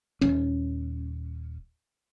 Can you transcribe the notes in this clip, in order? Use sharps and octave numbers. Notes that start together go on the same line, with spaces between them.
D#1 C#4